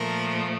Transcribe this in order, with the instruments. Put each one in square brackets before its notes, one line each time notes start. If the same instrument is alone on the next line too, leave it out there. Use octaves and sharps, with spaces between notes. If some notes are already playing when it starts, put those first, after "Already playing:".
Already playing: [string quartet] A#2 F3 A3 A#4